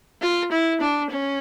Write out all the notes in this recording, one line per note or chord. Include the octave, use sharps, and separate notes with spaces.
F4
E4
D4
C#4